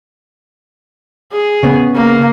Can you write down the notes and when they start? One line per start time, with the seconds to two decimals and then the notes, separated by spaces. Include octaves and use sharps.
1.32 G#4
1.63 C#3 B3
1.95 A#3